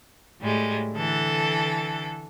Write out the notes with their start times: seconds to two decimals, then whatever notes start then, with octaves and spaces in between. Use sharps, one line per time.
0.41 A2 G3 G#3
0.94 D3 E3 A4